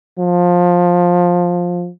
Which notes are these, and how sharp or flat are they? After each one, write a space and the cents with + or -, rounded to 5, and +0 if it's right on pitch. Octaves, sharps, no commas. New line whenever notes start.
F3 +15